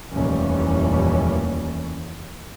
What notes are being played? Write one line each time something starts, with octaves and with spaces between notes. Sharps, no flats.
F1 D#2 A#2 E3 G3 C#4